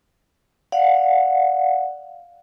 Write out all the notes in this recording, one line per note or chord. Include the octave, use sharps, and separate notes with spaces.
D5 F5 F#5